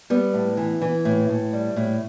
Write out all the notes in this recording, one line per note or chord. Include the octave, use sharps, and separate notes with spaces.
G3 B3
A2
E3
E3
A2
A2
G3
A2